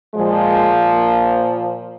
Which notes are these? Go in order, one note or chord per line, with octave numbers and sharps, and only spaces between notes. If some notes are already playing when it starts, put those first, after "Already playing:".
A#2 F3 G#3
A#3